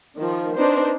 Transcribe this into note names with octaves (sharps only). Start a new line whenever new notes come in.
D#3 F3
C4 D4 D#4 B4 C5